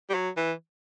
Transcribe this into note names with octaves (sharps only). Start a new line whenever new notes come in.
G3
F#3
E3